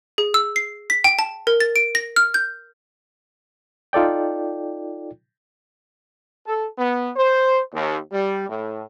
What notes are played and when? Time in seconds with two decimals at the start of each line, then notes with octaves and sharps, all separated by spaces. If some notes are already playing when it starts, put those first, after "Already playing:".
0.18 G#4
0.34 E6
0.56 C7
0.90 B6
1.04 G5
1.19 A5
1.47 A#4
1.60 A6
1.76 D7
1.95 A#6
2.16 F6
2.34 G6
3.93 D#4 F4 A4 D5 G5
6.47 A4
6.77 B3
7.17 C5
7.74 D#2
8.12 G3
8.49 A2